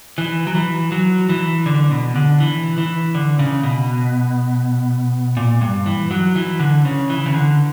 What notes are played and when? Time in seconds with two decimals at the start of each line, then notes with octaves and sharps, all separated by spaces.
0.18 E3
0.47 F#3
0.55 E3
0.92 F#3
1.29 E3
1.66 D3
1.91 B2
2.16 D3
2.40 E3
2.78 E3
3.15 D3
3.39 C#3
3.63 B2
5.37 A#2
5.61 G2
5.86 E3
6.11 F#3
6.35 E3
6.60 D3
6.85 C#3
7.10 E3
7.26 C#3
7.34 D3